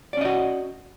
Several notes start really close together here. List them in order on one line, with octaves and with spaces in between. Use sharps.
D5 C#4 D#5 F#4